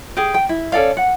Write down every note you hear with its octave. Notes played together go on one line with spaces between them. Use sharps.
G4 G#4
G5
E4
C#4 A4 D5 F5
F#5